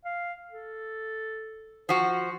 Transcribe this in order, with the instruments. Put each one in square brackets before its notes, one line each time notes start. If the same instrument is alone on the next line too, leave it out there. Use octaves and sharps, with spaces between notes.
[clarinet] F5
A4
[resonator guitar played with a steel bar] F3 F#4 [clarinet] C5